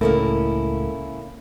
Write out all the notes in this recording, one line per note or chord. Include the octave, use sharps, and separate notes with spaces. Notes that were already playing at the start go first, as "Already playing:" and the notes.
C#2 A2 A#3 C#4 E4 A4 A#4